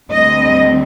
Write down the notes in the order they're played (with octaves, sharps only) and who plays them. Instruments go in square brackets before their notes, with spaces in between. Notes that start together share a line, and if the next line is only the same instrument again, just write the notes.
[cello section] D2 D3 G3 C4 D#5